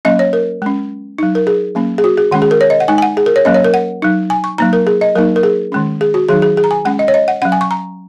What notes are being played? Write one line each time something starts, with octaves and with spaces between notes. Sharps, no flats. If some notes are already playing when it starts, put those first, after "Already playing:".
F#3 A#3 C#4 D#5
C#5
A#4
G#3 C#4
F#3 D#4
A#4
G#4
F#3 A#3 C#4
G#4
F#4
G#4
D#3 G#3 C#4 F#5
G#4
A#4
C#5
D#5
F#5
G#3 D#4 G#5
G#5
F#5
G#4
A#4
C#5
F#3 A#3 C#4 D#5
C#5
A#4
F#5
F#3 D#4
G#5
C#6
F#3 A#3 D#4 A#5
A#4
G#4
D#5
F#3 A#3 D#4 A#4
A#4
G#4
D#3 G#3 C#4
G#4
F#4
D#3 F#3 D#4 G#4
G#4
G#4
A#5
G#5
G#3 C#4 F#5
D#5
C#5
D#5
F#5
F#3 C#4 F#5
G#5
C#6
A#5